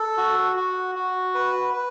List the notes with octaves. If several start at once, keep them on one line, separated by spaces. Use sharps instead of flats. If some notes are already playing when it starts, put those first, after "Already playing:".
Already playing: A4
F#4
F#4
F#4
B4
B4